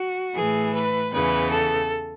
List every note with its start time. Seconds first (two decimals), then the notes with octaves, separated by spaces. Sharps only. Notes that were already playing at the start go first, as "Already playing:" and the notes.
Already playing: F#4
0.35 A2 E3 G#4
0.74 B4
1.13 E2 C#3 E3 B4
1.52 A4